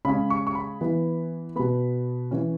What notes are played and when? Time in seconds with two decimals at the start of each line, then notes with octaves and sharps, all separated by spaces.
0.05 C#3 G#3 C#4 B5
0.30 C#6
0.47 C#6
0.55 B5
0.81 E3 B3
1.56 B2 B3 B5
2.31 E3 C#4